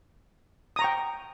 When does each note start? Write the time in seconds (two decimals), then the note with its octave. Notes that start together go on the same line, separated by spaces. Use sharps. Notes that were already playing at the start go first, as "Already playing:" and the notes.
0.76 D#6
0.79 A#5
0.82 C#6
0.84 G5